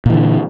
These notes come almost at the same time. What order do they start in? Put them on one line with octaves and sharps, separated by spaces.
A#2 E3 D3